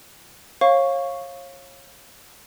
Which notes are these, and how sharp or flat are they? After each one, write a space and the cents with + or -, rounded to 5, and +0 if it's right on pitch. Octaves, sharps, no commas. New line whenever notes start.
C#5 -30 F5 +0 C#6 +0